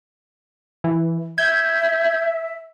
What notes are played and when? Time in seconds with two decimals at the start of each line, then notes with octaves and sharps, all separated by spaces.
0.84 E3
1.38 E5 G6 G#6